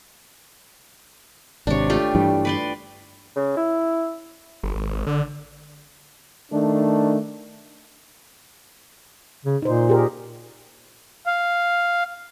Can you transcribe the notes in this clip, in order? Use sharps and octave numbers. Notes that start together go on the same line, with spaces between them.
G#1 C3 D4 C#5
A3 F4 G4
G2 E3 G3
B4 D5 C6
C#3
E4
G1
G#1
D3
D#3 A3 D4
C#3
A#2 D#4 C5
G4 G#4 A#4
F5